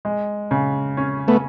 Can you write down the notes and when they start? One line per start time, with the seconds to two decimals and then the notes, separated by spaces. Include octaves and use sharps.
0.05 G#3
0.51 C#3
0.97 C#4
1.28 A3 B3